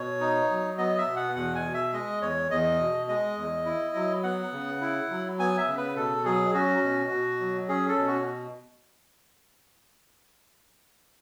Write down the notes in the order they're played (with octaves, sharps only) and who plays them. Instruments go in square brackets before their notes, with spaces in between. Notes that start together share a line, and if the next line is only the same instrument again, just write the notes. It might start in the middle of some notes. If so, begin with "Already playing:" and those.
Already playing: [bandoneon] B2 C#5
D#4
F#3
B3 D#5
E5
B2
F#5
E2 F#5
G#5
B2
E5
G#3 D#5
E2 C#5
E2 D#5
B2
G#3 D#5
E2
E4
F#3
B3 F#5
C#3
E4
F#3
B3 G#5
E5
C#3
B4
B2 A4
F#3 G#4
C#4 F#4
B2
B2
F#3
C#4 G#4
A4
B2
F#4